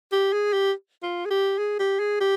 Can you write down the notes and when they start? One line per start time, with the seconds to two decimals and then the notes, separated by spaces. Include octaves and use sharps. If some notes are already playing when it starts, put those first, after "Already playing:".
0.12 G4
0.33 G#4
0.53 G4
1.03 F4
1.25 G#4
1.31 G4
1.58 G#4
1.79 G4
1.99 G#4
2.21 G4